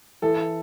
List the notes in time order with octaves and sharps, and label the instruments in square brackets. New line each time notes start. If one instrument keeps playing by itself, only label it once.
[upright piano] E3 [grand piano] A4